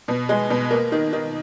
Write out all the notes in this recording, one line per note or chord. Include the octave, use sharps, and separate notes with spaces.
B2
G#3
B2
A#3
D#3
D#3